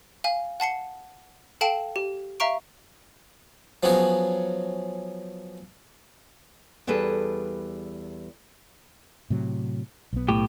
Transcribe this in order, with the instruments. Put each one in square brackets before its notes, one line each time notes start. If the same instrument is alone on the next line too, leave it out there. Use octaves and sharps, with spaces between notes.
[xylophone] F5 G#5
F#5 A5 C7 C#7
A4 F5 G5 A5 D7 E7
G4
E5 F5 A#5 C#6 D7
[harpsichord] F3 F#3 B3 C#4 F#4 G#4
[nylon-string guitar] E2 G3 G#4 A4 B4
[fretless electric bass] A2 C3 F#3
B1 B3
[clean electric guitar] A2 G4